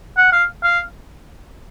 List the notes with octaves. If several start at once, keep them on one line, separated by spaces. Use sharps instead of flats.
F#5
F5
F5